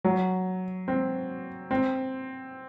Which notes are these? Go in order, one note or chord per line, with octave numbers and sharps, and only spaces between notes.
F#3
C4
C4